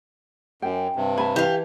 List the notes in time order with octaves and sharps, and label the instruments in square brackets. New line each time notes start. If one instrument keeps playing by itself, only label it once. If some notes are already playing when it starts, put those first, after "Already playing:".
[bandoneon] F#2 [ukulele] G5
[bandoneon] G2 C3
[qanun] G#5 [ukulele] A5 B5
[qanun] E3 [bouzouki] G4 F5